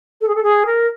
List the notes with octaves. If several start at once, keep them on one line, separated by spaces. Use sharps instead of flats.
A4
G#4
A4
G#4
A#4